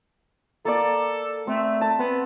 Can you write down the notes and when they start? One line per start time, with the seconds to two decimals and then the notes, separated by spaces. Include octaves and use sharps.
0.65 A#3 A4 D5
1.47 A3 C4
1.81 A5
1.99 B3 C4